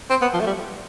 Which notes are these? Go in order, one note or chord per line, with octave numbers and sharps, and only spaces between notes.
C4
B3
F3
A3
G3